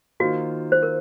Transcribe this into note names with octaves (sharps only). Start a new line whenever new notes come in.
D#3 A#3 F4 F#4 C5
C5
A#4